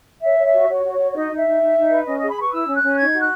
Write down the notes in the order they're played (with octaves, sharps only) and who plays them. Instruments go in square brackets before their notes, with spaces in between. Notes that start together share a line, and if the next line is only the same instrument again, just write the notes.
[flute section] C#5 E5
C#5
E5
F#4
F#4 C#5
F#4
C#5
F#4
C#5
D#4 D#5
D#4
E5
D#4
D#4
D#4
B4
C#4 D#5
G#4 D#5
B5
B4 C#6
E4 E6
C#4
F#6
C#4
D#4 G#6
F#4
F#6